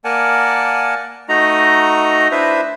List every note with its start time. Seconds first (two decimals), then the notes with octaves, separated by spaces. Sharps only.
0.05 A#3 A#4 D5 F#5 G#5 A5
1.29 A3 D#4 F#4 D#5 A#5
2.31 D4 E4 B4 C5 E5